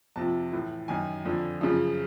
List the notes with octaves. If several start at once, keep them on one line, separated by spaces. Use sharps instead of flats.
F2 C3 F3 A5
A2 E3
F#2 D#3 G#5
F2 D3 F3
F#2 C#3 F3